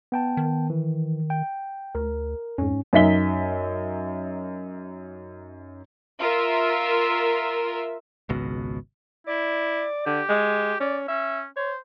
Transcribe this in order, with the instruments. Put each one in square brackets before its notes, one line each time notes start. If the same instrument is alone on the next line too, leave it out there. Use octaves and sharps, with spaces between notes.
[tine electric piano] B3 G5 A5
[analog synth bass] D#3
[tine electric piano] E3
G5
[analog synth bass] D2 [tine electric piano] A#4
[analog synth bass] F2 [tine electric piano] G#2 C#4
[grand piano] F#2 D#4 E5 B6 G7
[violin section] F4 A#4 E5
[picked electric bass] G#1 C#2 B2
[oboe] E4 [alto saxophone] D5
[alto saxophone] D3 [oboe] G4
[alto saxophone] G#3
[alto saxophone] C#4 [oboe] D5
[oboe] C#4 [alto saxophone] E5
[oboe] C5 [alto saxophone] C#5